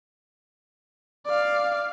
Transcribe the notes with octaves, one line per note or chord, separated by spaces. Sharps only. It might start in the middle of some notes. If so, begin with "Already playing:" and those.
D5 F5